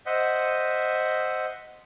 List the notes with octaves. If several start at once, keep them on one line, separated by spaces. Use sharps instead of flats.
C5 D#5 E5 F#5